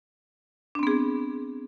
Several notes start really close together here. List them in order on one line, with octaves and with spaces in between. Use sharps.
D4 C4 B3 G#4